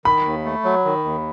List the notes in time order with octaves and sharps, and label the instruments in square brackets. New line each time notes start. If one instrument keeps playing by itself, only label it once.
[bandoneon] D#3 [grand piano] B5
[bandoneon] D#2
A3
F#3
D#3
D#2